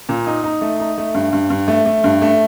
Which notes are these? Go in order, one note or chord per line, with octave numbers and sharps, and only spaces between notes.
A#2
D#4
D#4
A3
D#4
A3
G2
G2
G2
A3
A3
G2
A3